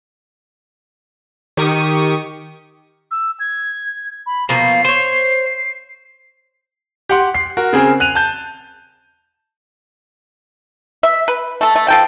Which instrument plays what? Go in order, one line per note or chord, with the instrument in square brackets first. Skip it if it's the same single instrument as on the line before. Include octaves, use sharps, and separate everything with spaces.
[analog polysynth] D#3 G4 C#6 D#6 D#7
[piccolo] E6
G#6
B5
[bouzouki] B2 F3 A#3 [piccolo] C7
[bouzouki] C5 C#5
[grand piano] G4 F#5 C6
C7
F#4 A#4
C#3 C4 G#4 A#4
F#6 D#7 F7
A5 G6
[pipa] E5
B4
A3 A4
A3
F3 A4 G5